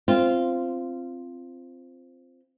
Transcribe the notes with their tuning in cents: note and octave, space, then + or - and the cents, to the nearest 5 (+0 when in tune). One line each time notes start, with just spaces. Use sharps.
C4 +0 F4 -15